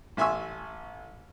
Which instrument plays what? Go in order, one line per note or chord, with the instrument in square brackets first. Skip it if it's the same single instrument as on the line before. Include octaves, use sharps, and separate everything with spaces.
[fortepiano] A1 E5 G#5 C6 C#6 E6